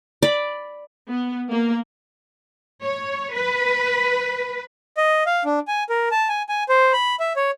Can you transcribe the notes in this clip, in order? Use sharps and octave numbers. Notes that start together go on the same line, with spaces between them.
D5 B5
B3
A#3
C#5
B4
D#5
F5
D4
G#5
A#4
A5
G#5
G#5
C5
B5
E5
C#5